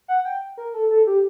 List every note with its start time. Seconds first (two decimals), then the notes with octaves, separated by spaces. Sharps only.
0.08 F#5
0.25 G5
0.57 A#4
0.74 A4
0.91 A4
1.07 G4